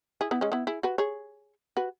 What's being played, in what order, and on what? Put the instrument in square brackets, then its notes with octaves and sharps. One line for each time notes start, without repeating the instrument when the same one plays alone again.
[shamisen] E4 G#4
B3 E4
G#3 C#4
B3 E4
E4 G#4
F#4 B4
G#4 C#5
F#4 B4